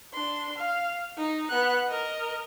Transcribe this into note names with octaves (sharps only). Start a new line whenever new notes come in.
D4 C6
F5
D#4
B3 F#6
A#4 D#5